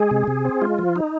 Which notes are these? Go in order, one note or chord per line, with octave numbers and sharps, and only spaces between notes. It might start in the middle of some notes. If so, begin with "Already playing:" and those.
Already playing: G#3 G#4
C3
C3
C4
G#3 F4
F3
D#4